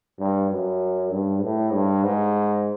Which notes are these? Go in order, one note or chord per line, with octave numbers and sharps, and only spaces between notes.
G2
F#2
G2
A2
G2
G#2